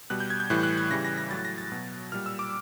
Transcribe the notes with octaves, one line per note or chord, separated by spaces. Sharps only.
B2 G3 F#6
G6
G#6
G6
A2 E3 G3 F#6
F#6
G#6
C#3 E3 G3 A#6
A#6
A#6
A2 F#3 A6
A#6
A6
B2 F#3
A#2 G3 F6
E6
D6